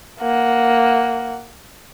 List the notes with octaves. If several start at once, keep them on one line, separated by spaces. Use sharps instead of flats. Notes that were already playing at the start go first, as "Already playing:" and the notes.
A#3 F#5